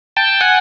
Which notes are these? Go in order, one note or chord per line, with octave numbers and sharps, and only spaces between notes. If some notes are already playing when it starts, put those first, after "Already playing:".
G5 A5
F#5 G#5